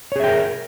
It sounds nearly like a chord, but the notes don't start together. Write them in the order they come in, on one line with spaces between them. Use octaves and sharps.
C#5 G#4 E5 G5 A#4